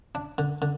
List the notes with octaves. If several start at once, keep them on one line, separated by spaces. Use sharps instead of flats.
D4
D3
D3